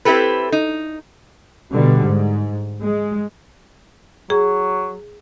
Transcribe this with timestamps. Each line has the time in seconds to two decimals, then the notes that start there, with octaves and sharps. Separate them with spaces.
0.05 C4 E4 G4 A4 B4
0.52 D#4
1.72 B2 D3 G3
2.03 G#2
2.82 G#3
4.30 F#3 G#4